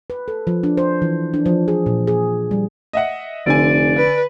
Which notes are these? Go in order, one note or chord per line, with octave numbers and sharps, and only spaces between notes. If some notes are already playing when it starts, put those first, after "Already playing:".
B4
A4
F3
D4
C5
E3
D4
F3
G#4
A#2
G#4
G3
D#5 E5 F#5
F1 D3 D5 G#5
B4